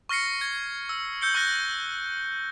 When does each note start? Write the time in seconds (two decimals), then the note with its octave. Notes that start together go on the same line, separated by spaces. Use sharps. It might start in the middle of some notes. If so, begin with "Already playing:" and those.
0.09 C#6 F6 A#6 C7 C#7
0.41 G#6
0.89 E6
1.21 E6 G6 C#7 G7
1.35 C#6 F#6 A#6